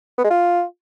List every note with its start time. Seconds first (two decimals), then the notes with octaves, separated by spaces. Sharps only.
0.18 B3
0.24 G#3
0.30 F4